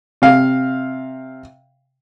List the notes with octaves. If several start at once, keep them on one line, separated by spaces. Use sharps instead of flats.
C3 F5